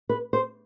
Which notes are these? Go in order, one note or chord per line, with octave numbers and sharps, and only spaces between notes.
B4
C5